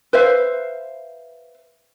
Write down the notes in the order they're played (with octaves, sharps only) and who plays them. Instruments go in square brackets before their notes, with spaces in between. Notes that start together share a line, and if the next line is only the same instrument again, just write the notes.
[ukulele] B4 C5 E5 F5